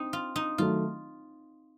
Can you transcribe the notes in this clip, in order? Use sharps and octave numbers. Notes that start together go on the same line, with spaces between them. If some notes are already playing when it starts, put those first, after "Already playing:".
Already playing: C4 D#4
F4
D#4
D#3 F#3 A3 F4